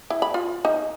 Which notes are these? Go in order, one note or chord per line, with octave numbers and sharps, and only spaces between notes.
E4
B5
F4
D#4